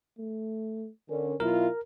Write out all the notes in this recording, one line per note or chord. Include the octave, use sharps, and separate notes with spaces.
A3
D3 C#4 A#4
B2 F#3 E4 F4 A#4